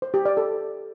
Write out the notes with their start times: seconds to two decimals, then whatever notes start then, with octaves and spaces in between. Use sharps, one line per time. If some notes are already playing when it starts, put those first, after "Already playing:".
0.02 C5
0.14 G4
0.25 D5
0.37 A4